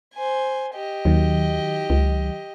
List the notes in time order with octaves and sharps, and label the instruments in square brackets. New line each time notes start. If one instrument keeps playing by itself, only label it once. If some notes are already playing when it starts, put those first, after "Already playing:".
[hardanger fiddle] C5 G#5
G4 D#5
[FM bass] D#2 [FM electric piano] D#3 F#3
[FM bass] C#2